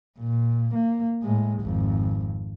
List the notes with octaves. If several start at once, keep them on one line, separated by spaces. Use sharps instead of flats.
A#2
A#3
A2 G#3
G#1 F2